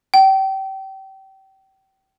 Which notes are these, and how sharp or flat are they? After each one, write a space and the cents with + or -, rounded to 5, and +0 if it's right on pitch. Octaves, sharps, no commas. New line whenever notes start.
G5 -30